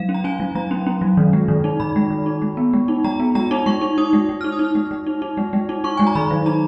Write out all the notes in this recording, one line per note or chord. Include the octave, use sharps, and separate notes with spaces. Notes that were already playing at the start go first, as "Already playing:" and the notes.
Already playing: F#3 F5
C#4
A#5
C#4 G#5
F#3
F#3 A#5
C#4
C#4
F#3
D#3
G#3
D#3
D#4
D#3 B5
G#3
D#3
D#4
G#3
B3
G#3
D#4
G#3 A#5
B3
G#3 A#5
D#4
G#3 C#6
D#4
D#4 D#6
G#3
G#3
D#4 F6
D#6
D#4
F6
G#3
G#3
D#4
D#4
G#3
G#3
D#4
D#4 C#6
G#3 G#5
A#5
D#3 B5
F#3
D#4 A#5